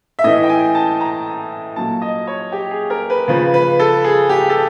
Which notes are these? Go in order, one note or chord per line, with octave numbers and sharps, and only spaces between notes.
E5
A2 E3 D#5
G5
G#5
A5
A#5
A#2 F#3 A5
D#5
C#5
G4
G#4
A#4
B4
C#3 F3 B4
B4
A4
G#4
G4
A4